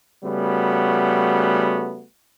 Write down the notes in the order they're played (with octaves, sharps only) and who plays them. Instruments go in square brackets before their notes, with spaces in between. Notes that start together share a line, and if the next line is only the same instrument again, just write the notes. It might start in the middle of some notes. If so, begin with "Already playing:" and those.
[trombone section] C#3 G3 A3 B3 F#4